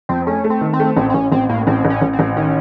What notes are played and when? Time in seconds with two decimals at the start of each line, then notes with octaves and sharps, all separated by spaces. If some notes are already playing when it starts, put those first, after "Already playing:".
0.09 F2 C4
0.27 A3 C#4
0.44 A3
0.50 C4
0.61 D#3
0.73 C4
0.80 A3
0.97 A1 C4
1.10 C4
1.14 A1 C#4
1.32 A1 C4
1.49 A2 A#3
1.67 A1 C4
1.85 A1
1.90 C#4
2.02 A1
2.13 C4
2.19 A1
2.36 D#3 C#4